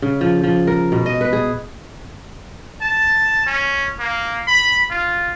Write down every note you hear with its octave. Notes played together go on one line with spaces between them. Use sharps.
C#3
F3
F3
A#4
B2
D#5
B4
G#4
A5
C#4
A#3
B5
F4